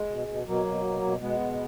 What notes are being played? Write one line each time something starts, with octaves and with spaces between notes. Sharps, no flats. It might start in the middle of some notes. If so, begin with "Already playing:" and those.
Already playing: G#3
B2
B2
B2 F#3 A#3
B2
B2
B2
B2 G#3 B3
B2